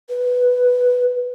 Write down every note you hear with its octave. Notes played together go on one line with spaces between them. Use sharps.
B4